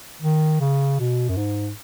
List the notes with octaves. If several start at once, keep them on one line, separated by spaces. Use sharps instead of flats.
D#3
C#3
B2
F#2
G#2